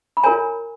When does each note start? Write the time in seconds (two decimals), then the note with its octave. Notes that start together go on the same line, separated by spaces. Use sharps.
0.17 B5
0.23 F4 A#4 C#5 G#5 A#5